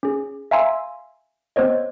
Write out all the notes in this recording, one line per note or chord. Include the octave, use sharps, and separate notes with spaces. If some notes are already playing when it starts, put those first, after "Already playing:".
C#4 G#4
E5 F5 G#5 A#5 C6 E6
B3 C4 C5 C#5 D#5